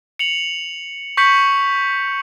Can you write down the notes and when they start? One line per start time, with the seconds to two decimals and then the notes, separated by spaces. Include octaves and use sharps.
0.19 C#7 F7 F#7
1.17 C#6 G6 B6 C#7 F#7